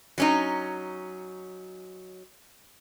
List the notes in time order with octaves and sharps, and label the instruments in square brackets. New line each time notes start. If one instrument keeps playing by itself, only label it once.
[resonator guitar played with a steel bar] F#3 C#4 D#4